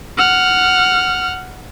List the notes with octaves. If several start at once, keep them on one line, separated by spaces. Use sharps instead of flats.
F#5 F6